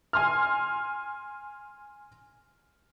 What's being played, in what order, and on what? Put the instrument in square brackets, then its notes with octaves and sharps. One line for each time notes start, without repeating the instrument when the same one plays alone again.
[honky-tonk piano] G#5 C6 F6